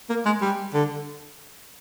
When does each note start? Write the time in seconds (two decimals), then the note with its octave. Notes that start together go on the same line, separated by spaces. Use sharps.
0.09 A#3
0.26 G#3
0.41 G3
0.74 D3